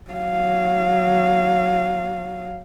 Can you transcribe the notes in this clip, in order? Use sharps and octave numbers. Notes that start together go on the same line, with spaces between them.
F#3 F5